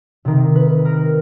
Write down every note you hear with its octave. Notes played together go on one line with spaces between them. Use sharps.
C3 D#3
B4
A#4